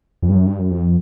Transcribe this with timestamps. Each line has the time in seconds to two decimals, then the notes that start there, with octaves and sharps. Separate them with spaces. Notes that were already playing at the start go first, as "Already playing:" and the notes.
0.22 F2
0.29 G2
0.35 F#2
0.46 G2
0.59 F#2
0.71 F2